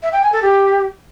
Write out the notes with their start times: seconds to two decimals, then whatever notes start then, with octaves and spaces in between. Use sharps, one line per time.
0.03 E5
0.13 G5
0.22 G#5
0.32 A4
0.42 G4